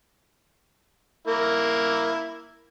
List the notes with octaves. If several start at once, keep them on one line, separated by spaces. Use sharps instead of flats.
A#3 E4